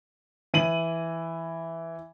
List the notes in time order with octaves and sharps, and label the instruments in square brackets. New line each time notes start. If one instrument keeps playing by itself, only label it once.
[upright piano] E3 D#7 F#7